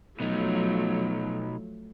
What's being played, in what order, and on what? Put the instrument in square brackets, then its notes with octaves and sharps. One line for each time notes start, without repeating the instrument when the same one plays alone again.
[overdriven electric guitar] B2 D#4 [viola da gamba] F3 F#3 A3